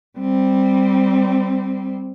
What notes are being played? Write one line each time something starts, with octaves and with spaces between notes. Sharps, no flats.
G3 C4